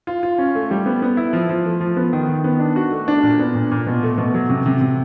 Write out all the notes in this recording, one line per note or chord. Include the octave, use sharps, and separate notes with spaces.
F4
F4
C#4
A3
G3
B3
B3
E4
F3
F3
A3
F3
B3
D#3
D#3
B3
D4
F#4
A3
D4
A#2
B3
A#2
A#2
B2
A3
B2
F#3
C3
C3
C3